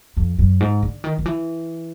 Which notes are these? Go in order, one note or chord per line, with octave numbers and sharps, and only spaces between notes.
F2
F#2
G#2
D3
D#3
D#3
E3